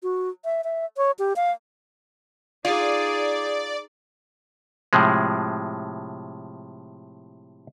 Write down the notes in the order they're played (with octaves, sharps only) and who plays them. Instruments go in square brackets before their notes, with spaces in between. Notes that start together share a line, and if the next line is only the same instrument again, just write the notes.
[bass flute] F#4
E5
E5
C#5
G4
F5
[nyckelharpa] D#4 G#4 [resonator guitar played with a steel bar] F4 [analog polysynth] D5
[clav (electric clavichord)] A2 C3 F3 G#3